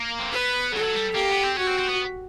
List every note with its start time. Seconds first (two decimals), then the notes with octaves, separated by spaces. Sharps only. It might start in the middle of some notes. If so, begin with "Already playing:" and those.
Already playing: A#3
0.20 C4
0.31 B3 B4
0.73 F#3 A4
0.84 F#3
0.94 G3
1.15 A#3 G4
1.30 B3
1.43 C4
1.57 C#4 F#4
1.67 C4
1.79 C4
1.89 B3